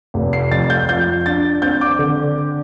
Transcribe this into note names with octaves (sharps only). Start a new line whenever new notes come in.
F1
C7
F2 A6
G6
F3 G6
D4 A6
C4 G6
D6
D3